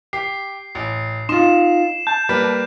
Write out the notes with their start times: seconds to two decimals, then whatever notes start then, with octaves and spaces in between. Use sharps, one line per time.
0.13 G4 C7
0.75 A1
1.29 D#4 F4 C6 E7
2.07 A5 G6
2.29 G3 A#3 B4